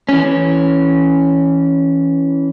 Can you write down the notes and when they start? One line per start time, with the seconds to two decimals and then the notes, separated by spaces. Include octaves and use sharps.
0.09 E3 C#4